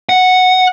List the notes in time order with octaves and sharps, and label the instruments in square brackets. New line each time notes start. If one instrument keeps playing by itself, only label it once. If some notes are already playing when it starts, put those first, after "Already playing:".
[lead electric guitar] F#5